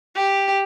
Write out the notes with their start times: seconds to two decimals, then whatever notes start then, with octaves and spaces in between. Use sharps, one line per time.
0.16 G4